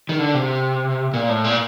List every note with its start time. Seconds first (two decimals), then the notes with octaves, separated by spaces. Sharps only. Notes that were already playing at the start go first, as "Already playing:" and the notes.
0.09 D#3
0.19 D3
0.35 C3
1.14 A#2
1.29 A2
1.44 A#2